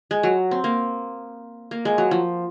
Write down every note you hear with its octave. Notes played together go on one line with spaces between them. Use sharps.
G#3
F#3
C4
A#3
A#3
G#3
F#3
F3